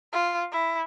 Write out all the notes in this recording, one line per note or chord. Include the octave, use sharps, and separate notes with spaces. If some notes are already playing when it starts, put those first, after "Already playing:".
F4
E4